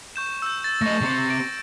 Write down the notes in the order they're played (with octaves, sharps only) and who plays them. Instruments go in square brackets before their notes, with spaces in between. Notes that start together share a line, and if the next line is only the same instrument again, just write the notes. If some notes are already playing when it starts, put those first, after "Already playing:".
[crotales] C#6 G6 E7
E6 G6
A6
[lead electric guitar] A3 D#5 [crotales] C#6 E6 A#6
[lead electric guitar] C3 C4
[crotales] D7